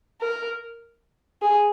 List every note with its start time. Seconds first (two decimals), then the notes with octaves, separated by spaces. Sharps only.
0.21 A#4
1.42 G#4